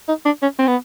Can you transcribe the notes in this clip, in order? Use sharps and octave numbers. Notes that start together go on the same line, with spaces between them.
D#4
D4
C#4
C4
B3